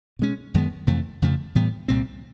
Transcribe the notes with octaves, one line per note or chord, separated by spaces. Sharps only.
B2 G#3 C#4
F#2 D#3 G#3 B3
F2 C3 E3 A3
F2 C#3 F3 A3
A2 E3 G3 B3
C2 A#2 G3 C4